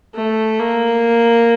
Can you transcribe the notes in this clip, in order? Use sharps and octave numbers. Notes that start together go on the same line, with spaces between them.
A3
A#3